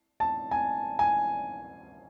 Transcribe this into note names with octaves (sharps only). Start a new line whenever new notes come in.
A5
G#5
G#5